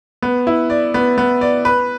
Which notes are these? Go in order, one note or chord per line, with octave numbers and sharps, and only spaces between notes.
B3
E4
D5
B3
B3
D5
B4